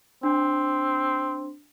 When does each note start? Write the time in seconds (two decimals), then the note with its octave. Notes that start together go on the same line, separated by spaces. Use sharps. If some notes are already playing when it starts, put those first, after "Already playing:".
0.23 C4 D4